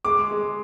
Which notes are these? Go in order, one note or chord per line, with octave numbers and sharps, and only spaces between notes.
G#3 D6
G#3